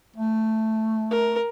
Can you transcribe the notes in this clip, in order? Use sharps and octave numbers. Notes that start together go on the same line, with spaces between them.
A3
A#4